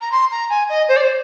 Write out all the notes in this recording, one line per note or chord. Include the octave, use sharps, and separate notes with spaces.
A#5
C6
A#5
G#5
D#5
C5
D5
C5